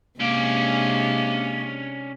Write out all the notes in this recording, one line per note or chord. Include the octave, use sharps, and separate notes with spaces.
C3 G#3 A#3 C#4 D4 D5